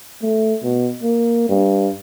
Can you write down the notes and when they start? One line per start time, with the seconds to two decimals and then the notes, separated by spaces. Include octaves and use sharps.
0.23 A3
0.64 B2
1.03 A#3
1.49 G2